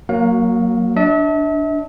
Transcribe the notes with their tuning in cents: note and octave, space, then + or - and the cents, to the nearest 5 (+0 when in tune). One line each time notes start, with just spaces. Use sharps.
F#3 +0 A#3 -5 F5 +35
D4 +0 E5 -40